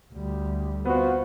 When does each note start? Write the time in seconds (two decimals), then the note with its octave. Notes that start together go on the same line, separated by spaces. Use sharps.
0.13 D2 G3
0.85 B3 F4 F#4 C5